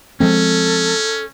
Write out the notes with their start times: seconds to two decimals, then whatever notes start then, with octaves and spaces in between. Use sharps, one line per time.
0.20 F3 G#3 C4 C#4 A4